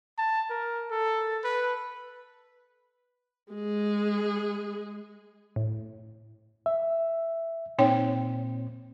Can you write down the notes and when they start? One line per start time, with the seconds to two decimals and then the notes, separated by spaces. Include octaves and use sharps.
0.18 A5
0.50 A#4
0.91 A4
1.44 B4
3.52 G#3 G#4
5.56 A2
6.66 E5
7.79 A#2 C4 D#4 C#5 G5